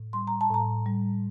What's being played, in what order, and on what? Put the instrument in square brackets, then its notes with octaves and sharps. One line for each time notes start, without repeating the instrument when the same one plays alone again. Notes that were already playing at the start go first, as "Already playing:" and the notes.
Already playing: [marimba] A2
G3 C6
A#5
A5
A2 A#5
G3